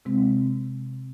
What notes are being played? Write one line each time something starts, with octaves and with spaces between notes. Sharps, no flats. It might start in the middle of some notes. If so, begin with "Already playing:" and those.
C3 G#3 C4